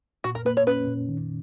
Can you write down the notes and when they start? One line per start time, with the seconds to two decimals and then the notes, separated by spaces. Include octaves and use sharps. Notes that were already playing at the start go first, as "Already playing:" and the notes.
0.24 A#2 F#4
0.35 A#4
0.45 A#3 B4
0.57 C#5
0.67 C#4 B4
0.88 A#2
1.09 D#3